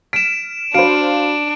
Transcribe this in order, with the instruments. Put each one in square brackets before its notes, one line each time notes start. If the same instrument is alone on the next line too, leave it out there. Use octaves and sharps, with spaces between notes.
[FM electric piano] F6 [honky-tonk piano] B6 [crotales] D7 E7
[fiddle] D4 [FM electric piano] F#4 B5 [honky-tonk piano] C5 F5 [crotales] D7